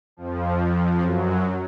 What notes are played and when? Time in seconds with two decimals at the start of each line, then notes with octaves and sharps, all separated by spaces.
0.17 F2 F3
0.99 F#2 F#3